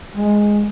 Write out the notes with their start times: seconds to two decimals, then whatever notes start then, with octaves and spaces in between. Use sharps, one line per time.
0.16 G#3